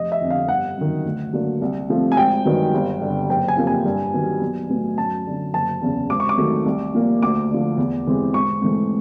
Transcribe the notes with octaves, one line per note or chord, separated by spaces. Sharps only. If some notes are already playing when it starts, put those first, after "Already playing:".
Already playing: F1 D#5
E5
F2 D3
F5
G1 F#5
F#2 D#3
D2
D3 F#3 A#3
C2
C3 F3 A3 C4
G#5
G#1 G5
G2 D#3 F#3 B3
G1
G2 D3
F#1 G5
G#5
F2 C3 F3 A#3
G#5
G2
D#3 F#3 B3
B1
A2 F#3 B3
F#2 A5
D3 F#3
F#1 A5
E2 C#3
G#1 D6
C#6
D6
G#2 D#3 F#3 A3
C2
A#2 F3 A#3
D2 D6
D3 F3
E2
C3 E3 G#3 C4
G#1 C#6
G#2 E3 A3 C4